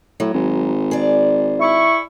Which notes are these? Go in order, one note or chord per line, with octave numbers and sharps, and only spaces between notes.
A2 F#3
G#1
G#4 D5
E4 C#6